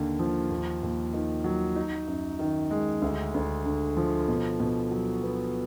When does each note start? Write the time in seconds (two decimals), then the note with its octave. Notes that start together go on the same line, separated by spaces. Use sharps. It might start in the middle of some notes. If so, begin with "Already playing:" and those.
Already playing: D#2 D3 A#3
0.19 F3
0.50 D#2
0.83 D#2
1.13 D#3
1.44 F#3
1.76 D#4
2.07 F#2
2.39 D#3
2.71 G#3
3.02 D2
3.34 D2
3.65 D3
3.97 F3
4.28 B2
4.60 B2
4.91 F#3
5.23 B3